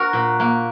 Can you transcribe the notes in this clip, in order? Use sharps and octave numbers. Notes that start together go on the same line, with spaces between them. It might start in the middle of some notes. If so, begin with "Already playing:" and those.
Already playing: F#4 A#4
A#2
A#3